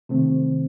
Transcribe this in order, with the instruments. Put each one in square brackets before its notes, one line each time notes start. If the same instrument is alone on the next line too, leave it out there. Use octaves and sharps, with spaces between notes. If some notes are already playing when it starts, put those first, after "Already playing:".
[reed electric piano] C3 D#3 A3 C4